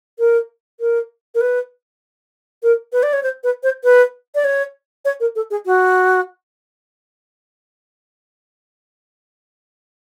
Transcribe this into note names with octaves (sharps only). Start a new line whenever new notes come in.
A#4
A#4
A#4
B4
A#4
B4
D5
C#5
C5
B4
C5
B4
D5
C#5
C#5
A#4
A4
G#4
F#4